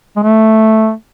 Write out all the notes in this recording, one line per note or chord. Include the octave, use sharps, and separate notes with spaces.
G#3
A3